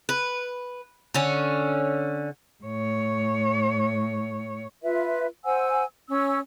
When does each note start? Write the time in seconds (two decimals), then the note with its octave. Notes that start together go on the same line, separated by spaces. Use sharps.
0.09 B4
1.14 D3 C#4
2.64 A2 C#5
4.82 F4 B4 E5
5.44 C5 F#5 G#5 E6
6.09 C#4 E6